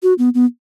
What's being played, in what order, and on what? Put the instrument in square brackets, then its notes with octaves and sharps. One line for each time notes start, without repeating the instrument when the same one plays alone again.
[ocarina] F#4
B3
B3